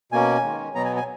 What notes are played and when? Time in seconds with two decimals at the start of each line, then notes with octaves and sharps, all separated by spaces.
0.12 B2 A#3 C#4 G#5
0.43 D#3 G#3 C#4
0.74 B2 F#3 B3 A#5
0.85 G#5
0.96 G#5